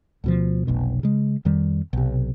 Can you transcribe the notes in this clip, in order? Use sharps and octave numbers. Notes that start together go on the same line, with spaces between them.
D2 B2 F3
F1 B1 B2
C#3 G#3
F2 D#3 G3
B1 C3